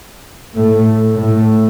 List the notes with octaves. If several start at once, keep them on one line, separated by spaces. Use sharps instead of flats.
A2 A3
A2 A3